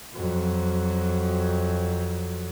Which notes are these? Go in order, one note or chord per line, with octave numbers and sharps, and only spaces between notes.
F2 F#3